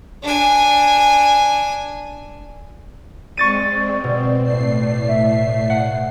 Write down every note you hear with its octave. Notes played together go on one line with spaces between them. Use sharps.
D4 G#5
G#3 C4 D5 C#6 A6 D#7
B2 C4
A2 A3 C7
E5
F#5